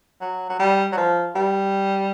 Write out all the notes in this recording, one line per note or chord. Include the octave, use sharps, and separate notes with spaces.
F#3
F#3
G3
F#3
F3
G3